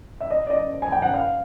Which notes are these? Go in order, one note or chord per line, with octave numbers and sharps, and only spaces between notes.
E5
D#5
D5
D#5
G#5
G5
F#5
F5